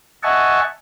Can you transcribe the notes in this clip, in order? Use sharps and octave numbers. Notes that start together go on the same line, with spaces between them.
D#5 E5 F#5 G#5 A5 C#6